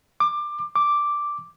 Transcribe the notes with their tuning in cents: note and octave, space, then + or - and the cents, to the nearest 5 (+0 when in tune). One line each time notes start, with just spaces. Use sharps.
D6 +20
D6 +0